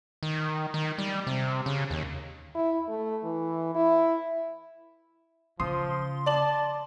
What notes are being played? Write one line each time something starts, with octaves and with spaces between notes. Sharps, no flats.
D#3
D#3
G3
C3
C#3
D#2
E4
A3
E3
E4
C#3 F3 C6 D#6
D5 A5 F#7